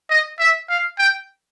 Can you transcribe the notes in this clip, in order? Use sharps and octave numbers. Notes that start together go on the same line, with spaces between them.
D#5
E5
F5
G5